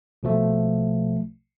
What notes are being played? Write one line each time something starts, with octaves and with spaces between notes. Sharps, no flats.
A#1 B2 F3 A3